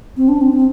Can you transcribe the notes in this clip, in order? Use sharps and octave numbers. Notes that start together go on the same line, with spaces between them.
C4
D4
C4
C4